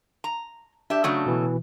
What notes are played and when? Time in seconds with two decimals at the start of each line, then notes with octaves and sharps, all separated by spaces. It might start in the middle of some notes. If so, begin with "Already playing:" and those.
0.24 A#5
0.90 D4 G4 E5
1.04 C#3 F#3 A3
1.26 B2 E3